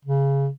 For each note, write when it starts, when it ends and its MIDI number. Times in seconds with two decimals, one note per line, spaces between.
0.05 0.49 49